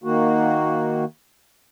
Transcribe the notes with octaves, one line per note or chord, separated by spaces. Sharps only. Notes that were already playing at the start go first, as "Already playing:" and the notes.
D#3 A#3 F#4